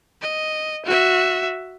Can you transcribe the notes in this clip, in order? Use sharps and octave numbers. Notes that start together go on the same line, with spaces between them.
D#5
F#4 E5